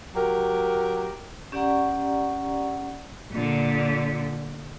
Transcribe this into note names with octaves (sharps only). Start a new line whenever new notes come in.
F#3 G4 A#4
C#4 G4 D5 F#5 A#5 C#6
A#2 D3